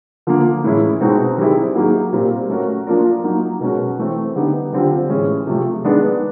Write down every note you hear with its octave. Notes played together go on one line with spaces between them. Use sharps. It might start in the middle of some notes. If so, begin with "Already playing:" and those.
D3 F3 A#3
A2 E3 G#3 C#4 E4
B2 G#3 C4 D#4 F#4
D#3 G3 C4 E4 G#4
F#3 A#3 D#4 G#4
A#2 G3 C4 F4 A#4
A3 C#4 F#4 A#4
F3 A#3 D4 F4 A#4
F#3 A#3 D#4
B2 G#3 C#4 F#4 A#4
E3 A3 C4
D3 G3 B3 D#4 G4
D3 G3 C4 F4
A2 E3 G#3 C#4
C3 F3 A3
D#3 G#3 B3 D4